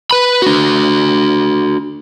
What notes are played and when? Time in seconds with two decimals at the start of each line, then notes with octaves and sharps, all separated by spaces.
0.11 B4 B5
0.42 D4 F#4